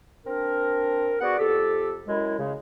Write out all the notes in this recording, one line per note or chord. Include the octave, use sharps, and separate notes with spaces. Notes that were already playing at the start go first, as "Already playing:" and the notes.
C4 D4 A#4
B3 F#4 G#4 D5 F#5
F2 G4 A4
F#2 G#3 E4
C#3 G#3